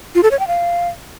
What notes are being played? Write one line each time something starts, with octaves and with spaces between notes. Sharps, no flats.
F4
A4
C#5
G5
F5